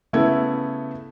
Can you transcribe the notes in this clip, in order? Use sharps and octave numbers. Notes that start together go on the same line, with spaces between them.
C#3 A3 B3 E4 G#6